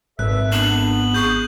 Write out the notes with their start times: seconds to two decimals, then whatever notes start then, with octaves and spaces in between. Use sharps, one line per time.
0.19 G#1 A4 B4 E5 F#6
0.52 B3 D4 F#7
1.14 G#4 C#6 G6